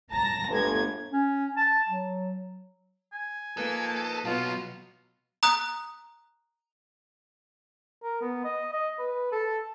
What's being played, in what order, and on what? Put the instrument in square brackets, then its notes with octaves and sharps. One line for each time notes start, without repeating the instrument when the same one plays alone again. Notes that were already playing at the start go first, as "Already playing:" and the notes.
[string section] A5 A#5 A#6
G1 A3 G#6
[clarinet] C#4
A5
F#3
[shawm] G#5
[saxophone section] F3 D#4 B4 [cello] A#3 [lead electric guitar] A4
[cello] B2 [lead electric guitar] F#3 B3 [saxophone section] F4
[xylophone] A#5 D#6 F#6
[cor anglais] A#4
B3
D#5
D#5
B4
A4